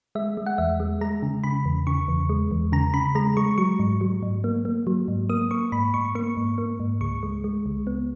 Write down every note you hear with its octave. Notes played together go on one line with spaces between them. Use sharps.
G#3 E5
G#3
F#5
E2 E5
G#3
G#3 A#5
C#3
C#3 B5
E2
C#3 C#6
E2
G#3
E2
C#3 A#5
C#3 B5
G#3 A#5
G#3 C#6
F#3 C#6
G#2
F#3
G#2
A#3
A#3
F#3
G#2
A#3 D#6
A#3 C#6
G#2 B5
G#2 C#6
A#3 C#6
G#2
A#3
G#2
C#2 C#6
G#3
G#3
C#2
B3